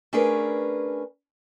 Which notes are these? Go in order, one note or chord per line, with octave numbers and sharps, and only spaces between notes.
A3 C#4 D4 G#4 A#4 B4